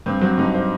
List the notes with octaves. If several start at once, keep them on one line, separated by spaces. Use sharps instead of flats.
G2 C4
F#3 C4
G2 D#4
C5